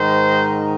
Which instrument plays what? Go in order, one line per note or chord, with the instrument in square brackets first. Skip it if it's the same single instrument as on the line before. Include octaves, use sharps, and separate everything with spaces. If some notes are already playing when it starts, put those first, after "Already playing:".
Already playing: [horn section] G#2 D#3 C5